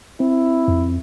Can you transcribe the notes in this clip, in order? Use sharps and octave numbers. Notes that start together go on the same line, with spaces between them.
C4 E4
F2